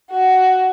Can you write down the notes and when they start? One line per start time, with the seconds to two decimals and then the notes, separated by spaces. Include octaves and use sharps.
0.11 F#4